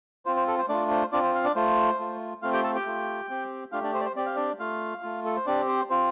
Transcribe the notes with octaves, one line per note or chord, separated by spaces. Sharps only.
C4 F4 C5
C5
A4
C5
A3 D4 F4 D5
C5
C4 D4 F4 D5
C5
F5
D4 D5
A3 F4 C5
A3 F4
A3 C4 F4 F5
G4 G5
A4 A5
G4 G5
A3 F4
C4 G4
A3 D4 F4 G4 F5
D4 D5
C5
D5
C5
C4 G4 D5
F5
D4 D5
A3 F4 F5
A3 F4
A4
C5
C4 D4 G4 D5
C5
C4 F4 C5